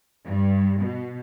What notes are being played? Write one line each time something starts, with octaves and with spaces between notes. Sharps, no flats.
G2
B2